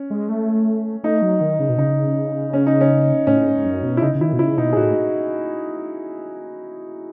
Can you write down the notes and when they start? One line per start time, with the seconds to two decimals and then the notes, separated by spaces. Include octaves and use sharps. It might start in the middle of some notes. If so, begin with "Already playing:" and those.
Already playing: C#4
0.10 G#3
0.29 A3
1.04 A3 D#4
1.22 F#3
1.41 D#3
1.59 C#3
1.69 B2
1.78 C#3 D#4
2.53 C#4
2.67 D#4
2.81 C#4
3.27 A2 C#4
3.46 G#2
3.58 G#2
3.65 F#2
3.83 B2
3.97 E4
4.02 C#3 D#4
4.15 C#3
4.21 D#3 E4
4.33 B2
4.39 C#3 E4
4.58 B2 D#4
4.73 G#4
4.77 A2 F#4